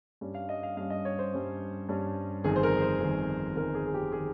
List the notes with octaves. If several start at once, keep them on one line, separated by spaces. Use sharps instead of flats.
G2 G3 C#4
F5
D#5
F5
G2 G3 C#4 F5
D#5
C#5
C5
G2 G3 C#4
G2 G3 C#4
G1 F2 D#3 G#4
C5
A#4
C5
G1 F2 D#3
G1 F2 D#3 A#4
G#4
G#4
G4
D#3 G#4